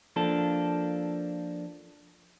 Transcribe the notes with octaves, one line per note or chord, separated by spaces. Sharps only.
F3 A#3 D4 A4